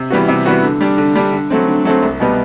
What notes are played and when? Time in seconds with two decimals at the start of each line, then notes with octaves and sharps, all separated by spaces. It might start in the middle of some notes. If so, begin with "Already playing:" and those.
Already playing: C3
0.10 E3 G3 B3 F#4
0.28 C3
0.46 E3 G3 B3 F#4
0.63 D3
0.81 G3 D4
0.98 D3
1.16 G3 D4
1.33 D3
1.50 F#3 A3 C4
1.68 D3
1.85 F#3 A3 C4
2.03 C2
2.20 B2 G3 B3